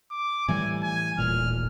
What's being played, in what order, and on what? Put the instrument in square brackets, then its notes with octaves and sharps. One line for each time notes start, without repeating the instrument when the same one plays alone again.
[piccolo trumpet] D6
[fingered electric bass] A2 E3 G3 [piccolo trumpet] G#5
[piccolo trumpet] G#5
[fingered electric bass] D#1 A1 A#2 [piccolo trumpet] F6